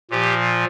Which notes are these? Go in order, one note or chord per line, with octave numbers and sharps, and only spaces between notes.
A#2 F3 G4